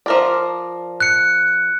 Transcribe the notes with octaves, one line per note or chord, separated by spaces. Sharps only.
F3 A#4 D5
F#6 C#7